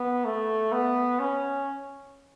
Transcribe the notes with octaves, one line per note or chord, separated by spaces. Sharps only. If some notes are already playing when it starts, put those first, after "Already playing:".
Already playing: B3
A3
B3
C#4